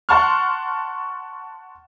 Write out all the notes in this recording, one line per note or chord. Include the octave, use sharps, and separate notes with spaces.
F#5 A5 C6 C#6 F6